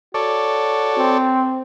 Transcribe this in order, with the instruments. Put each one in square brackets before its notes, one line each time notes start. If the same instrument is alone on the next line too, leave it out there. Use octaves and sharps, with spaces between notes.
[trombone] F#4 [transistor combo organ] A4 C#5 D5
[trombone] C4